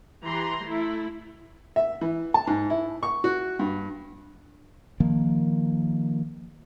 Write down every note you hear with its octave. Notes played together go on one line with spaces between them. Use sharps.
E3 G4 A#5 C6
A3 E4
E5
E3
A5
G#2
E4
C#6
F#4
G2
D#3 F3 A#3